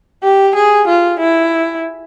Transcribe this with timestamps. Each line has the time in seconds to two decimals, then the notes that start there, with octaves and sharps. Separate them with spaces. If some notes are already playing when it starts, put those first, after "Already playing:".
0.23 G4
0.56 G#4
0.88 F4
1.20 E4